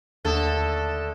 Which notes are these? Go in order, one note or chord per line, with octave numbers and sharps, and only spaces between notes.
D#2 D3 A3 A4 D#6 E7